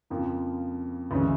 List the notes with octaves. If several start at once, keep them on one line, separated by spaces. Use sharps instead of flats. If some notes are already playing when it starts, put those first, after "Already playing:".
F2 C#3 F3 A#3
D2 C#3 E3 G#3 C#4